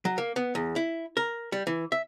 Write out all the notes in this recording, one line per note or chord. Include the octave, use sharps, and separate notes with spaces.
F#3
A#3
B3
E2
E4
A#4
G3
E3
E5